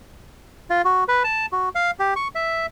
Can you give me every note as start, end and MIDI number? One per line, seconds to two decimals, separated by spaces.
0.70 0.82 65
0.85 1.04 66
1.08 1.23 71
1.24 1.46 81
1.52 1.69 66
1.75 1.91 77
1.99 2.14 67
2.16 2.28 85
2.35 2.66 76